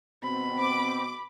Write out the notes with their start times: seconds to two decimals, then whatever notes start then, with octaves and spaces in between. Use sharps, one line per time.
0.23 B2 C4 B5
0.59 D6